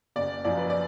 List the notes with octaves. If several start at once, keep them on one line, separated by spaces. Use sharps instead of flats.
F#1 D5
F#2 F3 D5
B4
D5